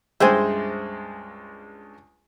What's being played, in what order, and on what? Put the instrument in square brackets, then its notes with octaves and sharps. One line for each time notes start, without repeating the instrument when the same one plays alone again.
[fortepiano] C#2 G2 G#3 [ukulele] G#4 C5 [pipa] E5 G5 G#5